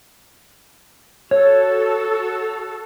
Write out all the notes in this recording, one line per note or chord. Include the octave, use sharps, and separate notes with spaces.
F#4 A4 C#5